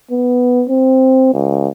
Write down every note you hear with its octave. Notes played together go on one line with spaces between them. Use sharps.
B3
C4
C#2